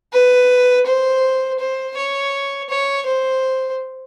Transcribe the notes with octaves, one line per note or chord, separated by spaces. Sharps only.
B4
C5
C5
C#5
C#5
C5